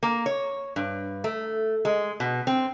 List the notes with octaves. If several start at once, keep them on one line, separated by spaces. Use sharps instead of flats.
A#3
C#5
G2
A3
G#3
B2
C4